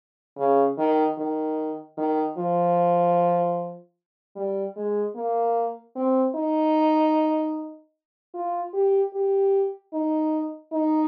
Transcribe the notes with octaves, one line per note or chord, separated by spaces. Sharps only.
C#3
D#3
D#3
D#3
F3
G3
G#3
A#3
C4
D#4
F4
G4
G4
D#4
D#4